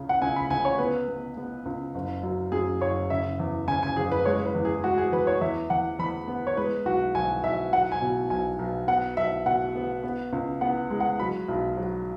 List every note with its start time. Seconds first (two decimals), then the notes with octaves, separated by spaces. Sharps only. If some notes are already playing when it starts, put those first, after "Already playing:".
Already playing: C#2 C#3
0.09 F#5
0.21 C#2 G#5
0.36 B5
0.50 C#2 G#5
0.65 C#5
0.78 B3 B4
1.08 B3
1.37 B3
1.66 C#2
1.95 F#1
2.23 F#2
2.52 F#2 G#4
2.81 F#1 C#5
3.10 C#3 E5
3.40 E2
3.68 C#3 G#5
3.83 G#5
3.97 F#1 G#4
4.12 B4
4.25 G#3 C#5
4.45 B4
4.55 E2
4.65 G#4
4.84 G#3 F#4
4.98 G#4
5.13 E2 B4
5.27 C#5
5.41 E2 E5
5.70 E2 F#5
5.99 E2 B5
6.28 B3
6.47 C#5
6.57 G#3 B4
6.85 B1 F#4
7.15 B1 G#5
7.43 B1 E5
7.73 F#3 F#5
7.92 G#5
8.02 B2
8.30 B1 G#5
8.59 B1
8.88 B3 F#5
9.17 B1 E5
9.46 B2 F#5
9.75 B3
10.03 B3
10.33 C#2
10.61 B3 F#5
10.90 G#3
11.00 F#5
11.19 F#3 B5
11.48 B1
11.77 F#3